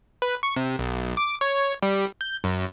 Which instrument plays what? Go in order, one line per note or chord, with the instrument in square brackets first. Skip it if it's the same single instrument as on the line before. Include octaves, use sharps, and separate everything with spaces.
[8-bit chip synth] B4
C#6
C3
B1
D6
C#5
G3
G6
F#2